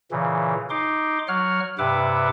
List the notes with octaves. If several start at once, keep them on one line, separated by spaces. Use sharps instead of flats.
A#2 C#3 E3
D#4 C6 D6
F#3 C#5 F#5 F6
G2 C3 B4 E5 F#5 D6